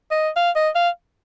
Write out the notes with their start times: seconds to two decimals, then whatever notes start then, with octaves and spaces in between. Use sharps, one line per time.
0.11 D#5
0.37 F5
0.56 D#5
0.75 F5